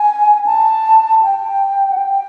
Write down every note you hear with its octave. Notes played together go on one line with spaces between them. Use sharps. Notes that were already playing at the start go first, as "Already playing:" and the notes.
Already playing: G#5
A5
G5
F#5
G5